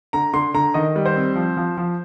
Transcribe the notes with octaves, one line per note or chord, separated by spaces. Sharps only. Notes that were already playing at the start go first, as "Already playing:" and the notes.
D3 A#5
D3 C6
D3 A#5
D#3 D#5
G3
C5
C4
F3
F3
F3